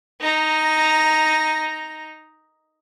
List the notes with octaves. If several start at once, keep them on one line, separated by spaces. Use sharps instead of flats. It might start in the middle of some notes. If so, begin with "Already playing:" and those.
D#4 A#5